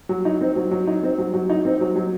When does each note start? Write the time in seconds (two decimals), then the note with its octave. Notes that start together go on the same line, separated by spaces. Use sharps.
0.09 F#3
0.25 D#4
0.41 C4
0.56 F#3
0.71 F#3
0.87 D#4
1.03 C4
1.18 F#3
1.33 F#3
1.49 D#4
1.65 C4
1.81 F#3
1.96 F#3